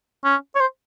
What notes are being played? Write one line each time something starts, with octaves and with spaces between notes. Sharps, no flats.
C#4
C#5
C5